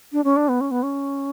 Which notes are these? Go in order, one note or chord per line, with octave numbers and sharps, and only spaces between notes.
D4
C#4
D4
B3
C#4
B3
C#4